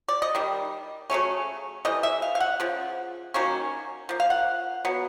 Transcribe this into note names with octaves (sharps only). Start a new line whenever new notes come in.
D5
D#5
D#3 G3
C#3 F#3 A3 C#4
C3 E3 A3 D#5
E5
F5
F5
F#5
C#3 F3
D#3 F#3 A#3 C#4
F3 A#3
F5
F#5
B2 F#3 B3